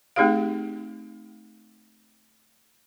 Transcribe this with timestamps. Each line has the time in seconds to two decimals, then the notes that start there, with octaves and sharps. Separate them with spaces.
0.16 A3 C4 D#4 G4 G#4 F5